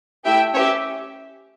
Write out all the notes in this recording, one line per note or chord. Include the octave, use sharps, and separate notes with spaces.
A3 E4 G4 E5 G5
C#4 C#5 E5
G4